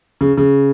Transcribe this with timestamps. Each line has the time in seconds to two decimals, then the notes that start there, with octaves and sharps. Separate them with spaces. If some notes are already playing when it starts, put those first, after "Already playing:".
0.21 C#3
0.37 C#3